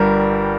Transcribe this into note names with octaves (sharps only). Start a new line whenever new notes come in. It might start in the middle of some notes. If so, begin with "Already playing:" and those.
Already playing: G1 G2 G3 A#4